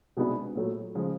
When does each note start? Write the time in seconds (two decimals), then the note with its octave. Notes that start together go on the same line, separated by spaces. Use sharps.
0.17 C2 B2 G#3 B3 D4
0.55 A#2 F#3 A3
0.95 C#3 F3 G#3